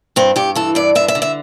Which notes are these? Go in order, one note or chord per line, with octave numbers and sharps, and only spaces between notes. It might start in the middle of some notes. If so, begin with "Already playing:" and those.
G2 C4
G2 G4
E3 A4
G2 D5
D3 E5
E5
D3
E5